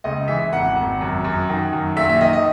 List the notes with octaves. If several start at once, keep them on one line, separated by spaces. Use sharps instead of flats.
C#2 D#5
E3 E5
G#1 F#5
G#1
F#2
F#2
D#3
F#2
A#1 E5
E5
D#3 D#5
D#5